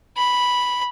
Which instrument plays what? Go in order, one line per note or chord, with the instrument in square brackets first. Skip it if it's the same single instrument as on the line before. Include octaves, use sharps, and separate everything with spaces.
[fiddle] B5